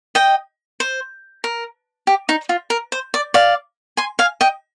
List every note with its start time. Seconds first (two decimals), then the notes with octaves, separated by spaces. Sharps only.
0.15 D#5 G5
0.80 C5
1.44 A#4
2.07 G4
2.29 D#4
2.49 F4
2.70 A#4
2.92 C5
3.14 D5
3.34 D5 F5
3.97 G#5 C6
4.19 F5 G#5
4.41 D#5 G5